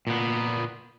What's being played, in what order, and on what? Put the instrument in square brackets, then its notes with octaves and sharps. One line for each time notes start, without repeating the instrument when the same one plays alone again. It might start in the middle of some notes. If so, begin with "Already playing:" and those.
[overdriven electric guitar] A#2 B3